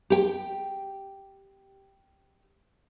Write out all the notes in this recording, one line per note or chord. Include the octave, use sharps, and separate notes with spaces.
G4 G5